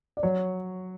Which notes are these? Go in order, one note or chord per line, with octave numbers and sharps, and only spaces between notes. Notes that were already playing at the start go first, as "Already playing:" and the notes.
D5
F#3 C#5